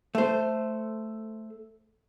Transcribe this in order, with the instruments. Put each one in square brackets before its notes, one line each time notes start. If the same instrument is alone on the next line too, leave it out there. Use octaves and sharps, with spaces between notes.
[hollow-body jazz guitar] A3 C5